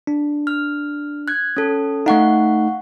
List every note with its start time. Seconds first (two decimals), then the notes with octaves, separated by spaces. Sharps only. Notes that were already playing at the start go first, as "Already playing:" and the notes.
0.07 D4
0.47 F6
1.28 F#6 G#6
1.57 C#4 A4
2.06 A3 D#4 F5 F#5 C#6